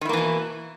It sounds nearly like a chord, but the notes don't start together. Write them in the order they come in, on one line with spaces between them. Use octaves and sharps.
D#3 E4 A#3 E3 B2